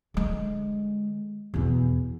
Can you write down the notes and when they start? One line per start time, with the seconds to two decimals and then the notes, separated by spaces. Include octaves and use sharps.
0.14 D3 G#3
1.54 E2 B2